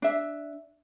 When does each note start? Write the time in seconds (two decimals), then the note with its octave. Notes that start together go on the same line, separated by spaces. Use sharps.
0.02 D4 E5